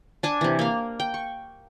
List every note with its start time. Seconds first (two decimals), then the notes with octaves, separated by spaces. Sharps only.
0.23 D4 G#5 A5
0.41 C3 E3
0.59 A#3 F5
1.00 G5
1.14 C#6